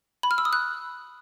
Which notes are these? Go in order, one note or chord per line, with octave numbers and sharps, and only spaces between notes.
B5
F6
E6
D#6
F#6